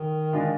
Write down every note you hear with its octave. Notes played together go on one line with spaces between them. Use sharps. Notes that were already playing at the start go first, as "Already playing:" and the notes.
Already playing: D#3
D3 G#3 D4 F4